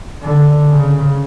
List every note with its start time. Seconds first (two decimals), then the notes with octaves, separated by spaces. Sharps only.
0.22 D3
0.70 C#3